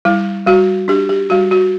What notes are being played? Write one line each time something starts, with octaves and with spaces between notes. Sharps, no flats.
G3 E4
G3 F#4
D4 G4
G4
G3 F#4
F#4